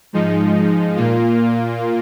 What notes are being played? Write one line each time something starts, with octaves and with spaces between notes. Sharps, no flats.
G#2 F3 G#3 D#4
A#2 A#3 F4